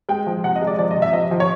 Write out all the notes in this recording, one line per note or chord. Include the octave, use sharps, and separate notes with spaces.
G#3 G5
F3
C3 F#5
D#5
G#3
D5
F3 D5
D#5
C3
E5
F3 D#5
F3
C#5